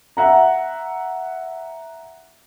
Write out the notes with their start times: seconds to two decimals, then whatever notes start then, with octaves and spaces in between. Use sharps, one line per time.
0.17 E5 F#5 A#5